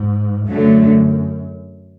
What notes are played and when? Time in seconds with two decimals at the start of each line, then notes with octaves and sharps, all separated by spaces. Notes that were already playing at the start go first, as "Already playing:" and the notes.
Already playing: G#2
0.49 F#2 D3 F#3 A3